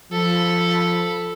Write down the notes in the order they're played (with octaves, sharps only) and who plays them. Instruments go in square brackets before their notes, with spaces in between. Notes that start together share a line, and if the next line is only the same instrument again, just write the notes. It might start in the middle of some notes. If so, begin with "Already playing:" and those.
[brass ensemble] F3 [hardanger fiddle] A4 B5